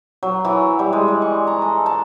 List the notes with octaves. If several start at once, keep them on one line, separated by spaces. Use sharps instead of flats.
F#3
E3
G3
G#3
D5
C#6
A#5
A4
A5